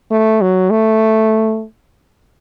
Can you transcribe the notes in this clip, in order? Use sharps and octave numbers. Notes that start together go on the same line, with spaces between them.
A3
F#3
A3